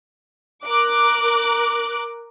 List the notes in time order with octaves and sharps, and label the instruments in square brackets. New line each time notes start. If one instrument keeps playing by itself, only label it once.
[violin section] A#4 D6 F#6